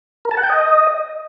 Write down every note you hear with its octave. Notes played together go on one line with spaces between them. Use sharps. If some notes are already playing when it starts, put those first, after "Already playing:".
A#4
A5
F#5
G5
D#5